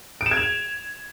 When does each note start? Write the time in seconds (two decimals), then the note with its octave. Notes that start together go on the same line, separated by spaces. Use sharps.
0.21 D7
0.26 E7
0.31 G#6
0.37 F7